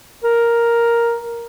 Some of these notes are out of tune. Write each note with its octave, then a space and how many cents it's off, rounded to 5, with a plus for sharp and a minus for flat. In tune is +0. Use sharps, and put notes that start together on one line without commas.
A#4 +5